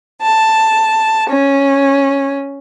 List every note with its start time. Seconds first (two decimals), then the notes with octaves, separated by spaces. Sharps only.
0.21 A5
1.29 C#4